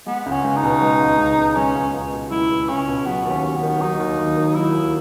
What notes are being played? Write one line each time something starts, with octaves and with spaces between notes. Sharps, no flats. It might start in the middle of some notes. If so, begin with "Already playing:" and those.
G#3 B3
C#2
C#4
C#2
D#4
B2
G#3
C#2
C#2
B2
G#3 C#4
C#2
C#2
B2
G#3 E4
C#2
C#2 C#4
B2
F#3 B3
D#2
C#4
D#2
B3
D#3
F#3 D#4
D#2
D#2
D#3
F#3 E4
D#2